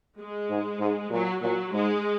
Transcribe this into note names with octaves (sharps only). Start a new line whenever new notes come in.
G#3
G#2
G#2
A#2 F#3
A#2 F#3
G#2 G#3